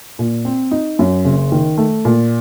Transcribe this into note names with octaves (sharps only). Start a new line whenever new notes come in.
A#2
C4
D#4
F#2
F#1
D#3
A3
A#2